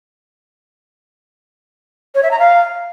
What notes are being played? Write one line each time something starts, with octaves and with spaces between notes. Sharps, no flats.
C#5
E5
A#5
F5